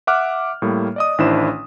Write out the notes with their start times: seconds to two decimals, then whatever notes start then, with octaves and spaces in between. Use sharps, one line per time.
0.07 E5 F#5 D6 F6 F#6
0.62 A2 G3 A#3
0.96 D5 D#5 D#6
1.18 A1 D#3 D4 E4 C5 E7